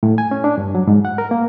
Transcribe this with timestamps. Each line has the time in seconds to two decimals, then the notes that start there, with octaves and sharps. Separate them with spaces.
0.03 A2
0.18 G#5
0.31 C#4
0.44 D4
0.58 G2
0.75 F#3
0.87 G#2
1.05 F#5
1.18 A#4
1.31 A#3